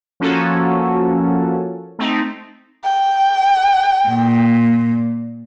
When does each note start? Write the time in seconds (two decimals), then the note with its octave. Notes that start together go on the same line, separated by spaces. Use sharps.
0.20 F3 A#3 C#4 F#4 A4
1.99 A3 C4 D#4
2.84 G5
4.08 A#2